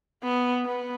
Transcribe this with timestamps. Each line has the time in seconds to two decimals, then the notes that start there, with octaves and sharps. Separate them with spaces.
0.24 B3
0.66 B3